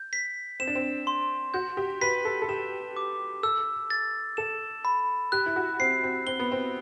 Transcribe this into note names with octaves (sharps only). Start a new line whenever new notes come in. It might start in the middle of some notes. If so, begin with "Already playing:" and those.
Already playing: G6
B6
C4 E7
D4
C4
C6
F#4 G6
G4
B4 B6
A4
A4
G4 E7
D6
A4 E6
A6
A4 E7
B5
G4 F#6
E4
F#4
C4 C7
C4
C4 G7
B3
C4